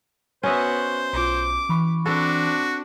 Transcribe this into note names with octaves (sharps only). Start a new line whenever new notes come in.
B3 C#4 F#4 C5 D#5 E5
B1 F4 D6
E3 B5 C#6
C4 D4 F#4 A4